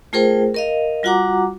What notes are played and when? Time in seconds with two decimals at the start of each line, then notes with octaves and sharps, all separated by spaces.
0.13 A3 F4 G#4 A#4 C5 G5
0.54 A#4 D#5 F5
1.03 G3 F4 F#4 F#5 A#5 D6